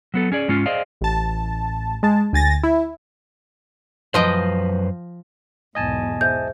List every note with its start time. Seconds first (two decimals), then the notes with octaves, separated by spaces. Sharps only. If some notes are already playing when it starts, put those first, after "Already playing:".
0.14 F#3 B3 A4
0.32 C#4 G#4 D5
0.48 G#2 G#3 C#4 F4
0.66 G#4 C5 D5 D#5 F5
1.01 A1 A5
2.03 G#3 A5
2.33 D2 G#5 A6 A#6
2.63 E4
4.14 F#2 F3 B4 C5 D#5 G5
5.75 B1 E2 G#2 D#5 G#5 A5
6.21 G#4 C5 E5 G6